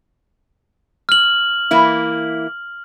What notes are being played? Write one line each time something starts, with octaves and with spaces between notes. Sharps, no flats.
F6 F#7
E3 A#3 E4